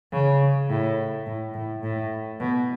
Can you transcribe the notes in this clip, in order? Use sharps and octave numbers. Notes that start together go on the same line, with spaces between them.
C#3
A2
A2
A2
A2
B2